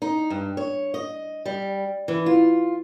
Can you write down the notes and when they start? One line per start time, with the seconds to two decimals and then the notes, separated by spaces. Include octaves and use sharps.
0.02 D#4
0.30 G2
0.57 C#5
0.94 D#5
1.46 G3
2.08 E3
2.26 F4